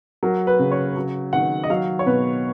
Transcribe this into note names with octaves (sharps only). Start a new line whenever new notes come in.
F#3 A#4
B4
C#3
C#5
F#3
D#3 F#5
D#5
F#3 F5
C#5
B2 B4